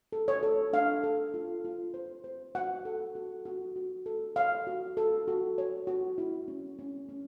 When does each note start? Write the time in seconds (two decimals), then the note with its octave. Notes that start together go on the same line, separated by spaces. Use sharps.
0.13 A4
0.28 C#5
0.43 A4
0.73 D4 F5
1.04 A4
1.34 F4
1.65 F4
1.94 C5
2.24 C5
2.55 F#4 F#5
2.85 A4
3.15 F#4
3.45 F#4
3.76 F#4
4.06 A4
4.36 C#5 F5
4.67 F#4
4.97 A4
5.28 F#4
5.58 C#5
5.87 F#4
6.18 E4
6.48 C#4
6.79 C#4
7.09 C#4